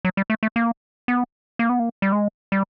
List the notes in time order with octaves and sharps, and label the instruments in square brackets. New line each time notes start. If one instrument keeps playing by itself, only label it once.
[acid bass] F#3
G3
A3
A3
A#3
B3
A#3
B3
A#3
G3
G#3
G3